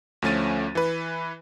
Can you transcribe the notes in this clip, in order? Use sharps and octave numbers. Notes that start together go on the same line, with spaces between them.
D2 F3 A3 C#4 A6 D#7
E3 B4